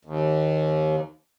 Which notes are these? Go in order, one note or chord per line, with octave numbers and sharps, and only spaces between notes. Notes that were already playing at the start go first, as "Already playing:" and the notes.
D#2